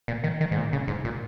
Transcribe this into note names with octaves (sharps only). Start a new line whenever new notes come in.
A#2
D#3
D#3
G#2
A#2
C#3
G#2
A#2